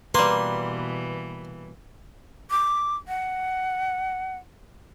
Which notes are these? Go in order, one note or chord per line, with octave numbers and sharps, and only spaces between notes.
B2 E3 G3 A#3 B4 C6
D6
F#5